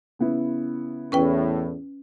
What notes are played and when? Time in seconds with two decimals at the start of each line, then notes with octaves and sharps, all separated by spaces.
0.19 C#3 B3 E4
1.12 E2 A2 C#4 B4 G5